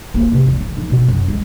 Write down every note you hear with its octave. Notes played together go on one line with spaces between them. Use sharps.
A#3
C3
E2
F3
D#4
B2
F#2
G#3